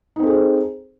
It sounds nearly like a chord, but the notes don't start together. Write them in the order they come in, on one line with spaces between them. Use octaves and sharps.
D#4 C4 A4 G#4 C5